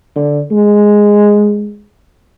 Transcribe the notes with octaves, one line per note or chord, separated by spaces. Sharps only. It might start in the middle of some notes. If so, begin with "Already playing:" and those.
D3
G#3